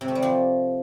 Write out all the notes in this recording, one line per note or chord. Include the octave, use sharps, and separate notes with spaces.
C3
A3
G3
F3